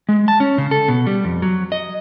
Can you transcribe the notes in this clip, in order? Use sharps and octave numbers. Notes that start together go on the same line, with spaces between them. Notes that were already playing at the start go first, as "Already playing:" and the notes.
G#3
A5
C#4
C#3
A4
B2
G3
F2
F#3
D#5